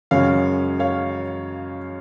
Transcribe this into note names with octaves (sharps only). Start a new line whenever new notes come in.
F#2 C#3 G#3 C#5 F5
C#5 F5